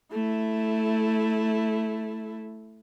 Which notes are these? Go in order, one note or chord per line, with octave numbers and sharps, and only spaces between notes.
A3 E4